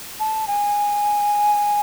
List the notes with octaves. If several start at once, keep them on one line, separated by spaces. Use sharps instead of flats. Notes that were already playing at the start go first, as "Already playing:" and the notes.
A5
G#5